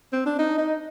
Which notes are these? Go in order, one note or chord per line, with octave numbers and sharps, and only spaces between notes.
C4
D4
D#4
D#4